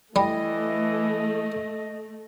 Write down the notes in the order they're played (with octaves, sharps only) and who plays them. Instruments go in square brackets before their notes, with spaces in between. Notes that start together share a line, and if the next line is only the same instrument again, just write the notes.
[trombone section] E3 E4 [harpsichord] G3 [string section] A3 [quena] D#5